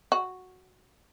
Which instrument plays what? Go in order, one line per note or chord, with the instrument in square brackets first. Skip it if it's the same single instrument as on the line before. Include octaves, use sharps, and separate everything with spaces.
[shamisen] F#4